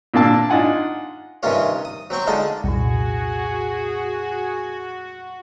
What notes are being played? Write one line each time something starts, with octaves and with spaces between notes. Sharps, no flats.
A#2 A#3 D4 A5 E6
D4 D#4 F4 F#5 G#5
G2 C3 D#3 C#4 F4 C#5
D#6
F#3 C4 G5 C#6
D3 G#3 D#4 F4 A5
C2 F2 A#2 F#4 G#4